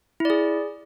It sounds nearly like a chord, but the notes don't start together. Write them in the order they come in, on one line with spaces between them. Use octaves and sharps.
E4 D5 G#4